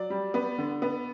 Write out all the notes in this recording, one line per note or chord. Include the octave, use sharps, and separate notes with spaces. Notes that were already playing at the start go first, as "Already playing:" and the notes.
Already playing: F#3 D5
G3
B3
D3
B3